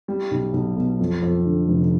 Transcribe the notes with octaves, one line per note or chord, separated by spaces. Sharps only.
G3
B1
B1
B2
F2
F2
D3
F1